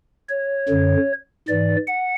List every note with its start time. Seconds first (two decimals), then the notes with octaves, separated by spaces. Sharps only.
0.29 C#5
0.69 F#2 D3
1.48 G#2 E3 D5
1.88 F#5